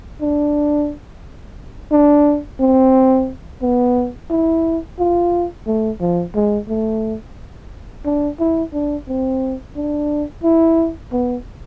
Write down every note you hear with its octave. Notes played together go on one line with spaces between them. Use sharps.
D4
D4
C4
B3
E4
F4
A3
F3
G#3
A3
D4
E4
D4
C4
D4
E4
B3